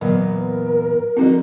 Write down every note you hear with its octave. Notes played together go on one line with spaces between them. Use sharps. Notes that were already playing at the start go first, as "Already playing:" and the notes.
E2 A#2 D3 F#3 B3 A#4
D3 F3 A3 C4 D#4 E4 F#4 D#5